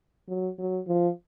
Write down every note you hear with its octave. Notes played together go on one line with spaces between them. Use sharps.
F#3
F#3
F3